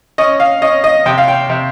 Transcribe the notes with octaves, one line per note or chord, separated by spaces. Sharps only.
C#4 D#5
F5
C#4 D#5
D#5
C3 G5
F5
G5
C3